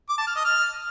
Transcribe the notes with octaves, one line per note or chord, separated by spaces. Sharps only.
D6
A5
F6
D#5
F6